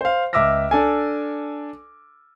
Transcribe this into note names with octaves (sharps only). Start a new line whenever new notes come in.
C5 F5
C#2 E5 D6 E6 F6 A#6
D4 A4 G#5